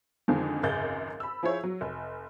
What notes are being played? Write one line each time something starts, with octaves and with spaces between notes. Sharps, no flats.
F2 D3 D#3 F3 G#3
G#1 C#2 F#2 G#4 G6 A6
B5 E6
F3 E4 G#4 C5 C#5
F#3
F1